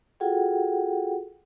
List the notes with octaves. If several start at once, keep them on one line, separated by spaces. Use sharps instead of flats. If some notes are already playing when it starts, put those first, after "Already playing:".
F4 F#4 G#4 A4 F#5 G5